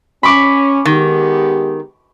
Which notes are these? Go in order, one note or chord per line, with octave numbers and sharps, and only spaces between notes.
C#4 B5 C#6 D6
D#3 G#3 B3 G4